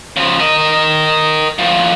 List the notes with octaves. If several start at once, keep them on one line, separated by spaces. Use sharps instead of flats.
C#3 F3
A#4 D#5
A2 F3